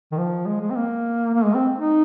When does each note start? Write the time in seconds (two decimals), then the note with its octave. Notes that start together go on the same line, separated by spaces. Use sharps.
0.12 D#3
0.18 F3
0.46 G#3
0.61 G#3
0.71 C4
0.76 A#3
1.35 A#3
1.44 G#3
1.55 C4
1.79 D#4